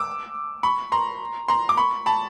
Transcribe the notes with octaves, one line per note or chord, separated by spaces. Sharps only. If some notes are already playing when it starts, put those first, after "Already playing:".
Already playing: D6 E6
B5 C#6
A#5 C6
A#5 C6
D6
B5 C#6
A5 B5